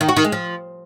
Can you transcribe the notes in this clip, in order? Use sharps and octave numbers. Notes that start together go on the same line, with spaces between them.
D#3
F#4
D#3
G#3
F3